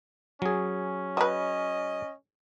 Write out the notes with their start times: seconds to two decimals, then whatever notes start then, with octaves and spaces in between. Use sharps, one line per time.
0.42 F#3 C#4 G#4
1.17 F#4 B4 D#5